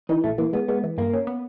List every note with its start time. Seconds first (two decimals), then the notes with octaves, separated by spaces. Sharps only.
0.09 E3 D#4
0.24 A#1 A3
0.38 E3 A#3
0.53 G#3 B3
0.68 G#3 B3
0.84 E3
0.98 G2 A#3
1.13 C#4
1.27 B3